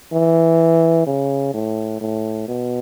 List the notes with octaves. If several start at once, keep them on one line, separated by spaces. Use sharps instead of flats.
E3
C#3
A2
A2
B2